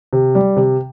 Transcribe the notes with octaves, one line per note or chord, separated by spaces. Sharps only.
C3
G3
C3